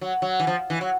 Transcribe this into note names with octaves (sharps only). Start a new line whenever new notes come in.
F#3
F#3
E3
F3
E3
F#3